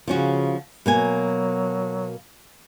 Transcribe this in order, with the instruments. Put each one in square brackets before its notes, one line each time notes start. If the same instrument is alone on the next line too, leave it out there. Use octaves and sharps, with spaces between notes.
[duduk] C#3 [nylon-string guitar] F3 C#4 F#4
[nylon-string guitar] B2 A#3 G#5 [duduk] F#3